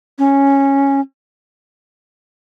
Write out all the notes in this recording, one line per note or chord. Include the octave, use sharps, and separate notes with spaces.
C#4